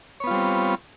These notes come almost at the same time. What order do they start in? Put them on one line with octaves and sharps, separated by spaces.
C#5 B3 F4 G3 C4